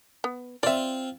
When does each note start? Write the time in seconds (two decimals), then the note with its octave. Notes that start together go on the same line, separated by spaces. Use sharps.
0.24 B3
0.63 C4 F4 D5 E5